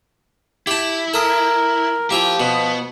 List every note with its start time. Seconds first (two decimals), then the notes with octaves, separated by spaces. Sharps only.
0.67 E4 G4 A5
1.14 A4 A#4 D#6
2.11 F3 A#3 E4 F4 G4
2.40 B2 B3